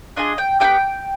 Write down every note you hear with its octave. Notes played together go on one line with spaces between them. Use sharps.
D4 F4 G#4 D#5
G5
B3 D#4 G4 G5